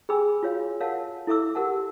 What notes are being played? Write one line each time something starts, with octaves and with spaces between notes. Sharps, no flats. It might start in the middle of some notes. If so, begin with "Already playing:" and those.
G#4 G5 G#5 B5 E6
F4 F#4 C#5 F5
A#4 C#5 F5 F#5 A5
E4 A4 E5 D6 E6
G4 A#4 F#5 A5